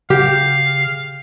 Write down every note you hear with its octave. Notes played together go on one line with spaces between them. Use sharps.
C#3 G4 F5